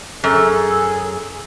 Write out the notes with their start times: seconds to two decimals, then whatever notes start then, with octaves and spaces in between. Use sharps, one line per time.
0.24 F#2 G#4 A4